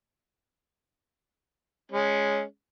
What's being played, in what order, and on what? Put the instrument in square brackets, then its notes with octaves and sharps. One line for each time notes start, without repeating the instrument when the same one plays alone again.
[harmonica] G#3 C#4